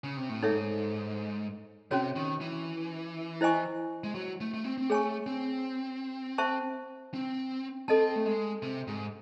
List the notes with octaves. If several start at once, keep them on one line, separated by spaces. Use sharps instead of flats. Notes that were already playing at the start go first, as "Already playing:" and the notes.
C#3
C3
A2
G#2 D#4 A4 C#5 E5
C3 C#4 F#4 C#5
D#3
E3
E4 C5 D#5 G#5 C#6
G#3
F#3
A3
A3
C4
C4
A3 G#4 C#5 G#5 C#6
C4
C5 E5 A5 C#6
C4
C4 A4 D#5 A5
A3
G#3
C3
G#2